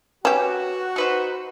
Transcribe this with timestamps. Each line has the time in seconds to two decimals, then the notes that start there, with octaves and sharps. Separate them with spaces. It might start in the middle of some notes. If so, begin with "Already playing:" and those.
0.25 C#4 F#4 G4 B4 D6 E7
0.96 D#4 B4 C5 C#7